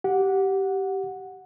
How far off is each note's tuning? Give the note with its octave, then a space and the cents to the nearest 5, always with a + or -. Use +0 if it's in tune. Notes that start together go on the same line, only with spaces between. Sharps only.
G4 -15 F#5 -10